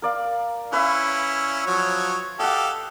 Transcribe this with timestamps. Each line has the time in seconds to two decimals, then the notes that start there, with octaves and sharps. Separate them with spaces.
0.02 A#4 D5 F5
0.73 C#4 E4 B4 E5
1.66 F3 F#3 C#5
2.39 G4 A4 D#5 F5 F#5